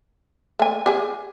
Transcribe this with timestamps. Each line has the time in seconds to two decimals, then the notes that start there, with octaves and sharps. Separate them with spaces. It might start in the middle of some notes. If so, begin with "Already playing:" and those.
0.59 A3 G#5
0.86 G4 G#4 G#5